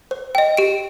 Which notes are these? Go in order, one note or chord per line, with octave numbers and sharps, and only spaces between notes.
C5
D#5 G5
G4 D7